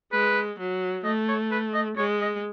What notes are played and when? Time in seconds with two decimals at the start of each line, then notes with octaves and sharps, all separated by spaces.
0.12 G#3 B4
0.59 F#3
1.04 A3 D#5
1.29 C#5
1.51 B4
1.74 D#5
1.97 G#3 C#5
2.21 D#5